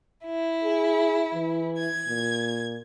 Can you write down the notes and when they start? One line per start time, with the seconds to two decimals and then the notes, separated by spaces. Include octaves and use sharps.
0.24 E4
0.64 G#4
1.33 E3
1.78 G#6
2.08 A#2